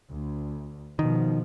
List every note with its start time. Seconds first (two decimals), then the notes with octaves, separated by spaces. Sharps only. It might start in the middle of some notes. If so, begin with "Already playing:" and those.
0.10 D2
0.99 B2 D#3 F3